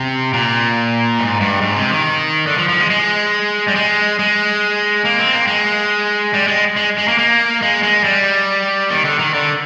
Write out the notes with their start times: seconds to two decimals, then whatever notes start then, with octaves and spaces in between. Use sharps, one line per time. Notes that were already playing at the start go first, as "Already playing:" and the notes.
Already playing: C3
0.33 A#2
1.19 G#2
1.40 G2
1.61 G#2
1.76 C3
1.91 D#3
2.47 D3
2.58 F3
2.69 F3
2.79 G#3
2.90 G#3
3.68 G3
3.75 G#3
4.19 G#3
5.05 A#3
5.19 C4
5.33 A#3
5.47 G#3
6.34 G3
6.48 G#3
6.76 G#3
6.98 G#3
7.08 A#3
7.19 A#3
7.62 G#3
7.83 G#3
8.04 G3
8.91 D#3
9.05 D3
9.19 D#3
9.34 D3